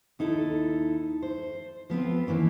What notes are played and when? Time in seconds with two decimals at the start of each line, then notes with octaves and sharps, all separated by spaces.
0.19 D#2 D#4 E4 A4
1.22 C5
1.90 F3 B3 C4 F4
2.27 D#3 E3 A#3 C#4